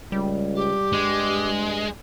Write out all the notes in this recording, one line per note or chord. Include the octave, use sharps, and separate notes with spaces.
C#2 G3
G4
G2 G#3